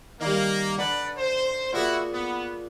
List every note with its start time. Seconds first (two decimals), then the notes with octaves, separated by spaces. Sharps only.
0.21 D#3 G3 A#3
0.78 D3 B4 D5 F#5
1.17 C5
1.73 A#2 E4 F#4 G#4
2.12 B3